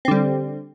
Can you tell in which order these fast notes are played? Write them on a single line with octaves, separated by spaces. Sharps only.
C4 D3 G3